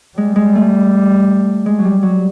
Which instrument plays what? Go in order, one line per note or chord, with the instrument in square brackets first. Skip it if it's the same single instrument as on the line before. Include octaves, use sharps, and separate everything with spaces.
[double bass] G3 [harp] G#3
[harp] G#3
A3
G#3
F#3
G3
F#3